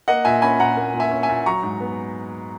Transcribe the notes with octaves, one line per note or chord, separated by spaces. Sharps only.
A#3 D#5 F#5
A#2 E5 G#5
C#4 G#5 B5
A#2 F#5 A#5
A#3
A#2
E5 G#5
C#4
E5 G#5
A#2
F#3 A#5 C#6
G#2
B3